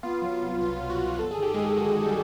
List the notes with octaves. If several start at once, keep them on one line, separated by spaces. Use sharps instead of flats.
B3 F4
F#3
F4
C2
B2 F4
B3
F#4
F#3
G1 A4
G#4
D#3 G4
G1 G#3 G#4
G4
F#2 F#4
G1
G3 G4